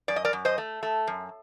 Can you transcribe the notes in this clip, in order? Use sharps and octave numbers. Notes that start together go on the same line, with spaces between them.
F#2 D5
D#5
A#4 D5
F#2
C5 D#5
A3
A3
F#2